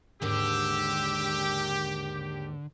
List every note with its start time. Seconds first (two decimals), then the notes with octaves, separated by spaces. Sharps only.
0.22 D#2 G#2 D3 G4 E6